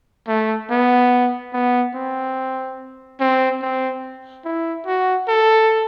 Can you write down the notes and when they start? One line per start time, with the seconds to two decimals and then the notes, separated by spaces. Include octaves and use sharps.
0.28 A3
0.71 B3
1.53 B3
1.95 C4
3.20 C4
3.62 C4
4.45 E4
4.86 F#4
5.28 A4